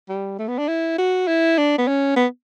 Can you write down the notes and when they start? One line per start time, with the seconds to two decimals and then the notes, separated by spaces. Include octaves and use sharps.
0.09 G3
0.39 A3
0.48 B3
0.58 D4
0.68 E4
0.98 F#4
1.28 E4
1.58 D4
1.78 B3
1.88 C#4
2.16 B3